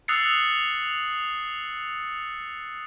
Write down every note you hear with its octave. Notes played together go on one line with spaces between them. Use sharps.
D#6 E6 F#6 A6 C7 C#7